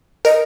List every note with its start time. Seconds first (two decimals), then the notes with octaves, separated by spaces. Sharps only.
0.25 A#4 D#5